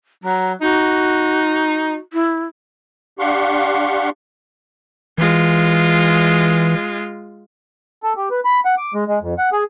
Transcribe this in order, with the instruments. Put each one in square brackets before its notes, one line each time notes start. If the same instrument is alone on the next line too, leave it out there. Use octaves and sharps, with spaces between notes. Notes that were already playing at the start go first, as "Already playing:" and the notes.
[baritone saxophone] F#3 [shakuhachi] A#5
[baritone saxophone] D#4 [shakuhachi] F#4
[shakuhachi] E4
[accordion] D4 G4 F5 F#5 C6 C#6
[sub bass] E3 [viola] G#3 F4
[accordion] A4
G4
B4
B5
F#5
D6
G#3
G#3
F2
F#5
G#4